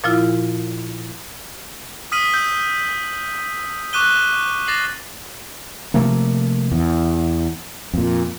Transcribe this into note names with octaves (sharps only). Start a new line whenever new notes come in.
A#2 F3 E4 F4
D#6 F6 B6 D#7 F#7
D#6 E6 G6
C#6 D6 F#6 D#7 G7
D6 A6 A#6 C7 F#7
C3 F3 A3 A#3
E2
F2 A#2